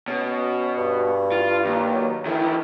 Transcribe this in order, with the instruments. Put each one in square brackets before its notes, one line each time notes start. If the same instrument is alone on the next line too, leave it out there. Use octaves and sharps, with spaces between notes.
[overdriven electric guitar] B2 [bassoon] C#4
[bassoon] G2
[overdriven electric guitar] F4
D#2
[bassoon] F#3
[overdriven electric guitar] D#3 E3 [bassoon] A3